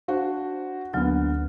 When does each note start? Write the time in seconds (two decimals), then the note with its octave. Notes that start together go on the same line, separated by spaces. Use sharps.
0.08 D4 F#4 C5
0.93 D2 D3 F#3 A#3 B3 F6